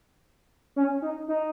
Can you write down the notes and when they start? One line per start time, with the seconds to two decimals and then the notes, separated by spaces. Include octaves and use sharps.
0.76 C#4
1.02 D#4
1.28 D#4